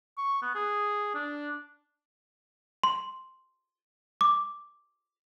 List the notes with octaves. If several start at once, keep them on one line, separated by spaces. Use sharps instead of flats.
C#6
B3
G#4
D4
C6
D6